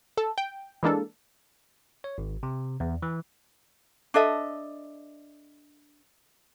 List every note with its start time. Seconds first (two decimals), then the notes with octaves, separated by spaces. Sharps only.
0.17 A4
0.38 G5
0.83 E3 G#3 A#3 D4 A4
2.04 C#5
2.18 G#1
2.43 C3
2.80 E2
3.02 E3
4.14 D4 A4 D#5 E5